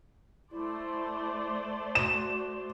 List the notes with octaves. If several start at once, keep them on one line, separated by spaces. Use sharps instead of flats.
A3 E4 C5 D5
F#4 E7